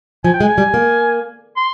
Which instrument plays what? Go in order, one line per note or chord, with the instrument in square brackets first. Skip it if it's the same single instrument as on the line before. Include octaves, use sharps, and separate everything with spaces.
[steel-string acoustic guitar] F3 [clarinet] G#5
[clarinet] G5
[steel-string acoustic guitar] G#3 [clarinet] G#5
[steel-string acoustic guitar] G3
A#3
[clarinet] C6